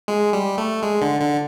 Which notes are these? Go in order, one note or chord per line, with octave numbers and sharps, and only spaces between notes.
G#3
G3
A3
G#3
D3
D3